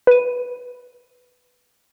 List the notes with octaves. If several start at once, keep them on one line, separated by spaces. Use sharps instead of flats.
B4 D#7